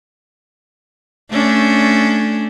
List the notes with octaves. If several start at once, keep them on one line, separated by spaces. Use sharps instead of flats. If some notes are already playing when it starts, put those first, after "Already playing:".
A3 C#4 D4